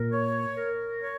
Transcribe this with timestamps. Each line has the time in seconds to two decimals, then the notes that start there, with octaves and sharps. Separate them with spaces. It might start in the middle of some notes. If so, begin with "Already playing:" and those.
Already playing: A#2 A#4
0.12 C#5
0.57 A#4
1.01 C#5